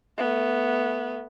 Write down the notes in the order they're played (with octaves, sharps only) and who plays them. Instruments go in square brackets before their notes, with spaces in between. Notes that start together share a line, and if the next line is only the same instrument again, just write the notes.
[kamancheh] A3 B3